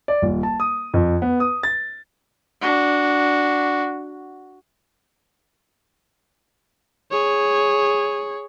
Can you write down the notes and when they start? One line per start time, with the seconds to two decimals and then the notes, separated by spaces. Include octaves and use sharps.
0.08 D5
0.22 D#1
0.43 A5
0.60 D#6
0.94 F2
1.22 B3
1.40 D#6
1.63 A6
2.61 D4 F#4
7.11 G#4 C#5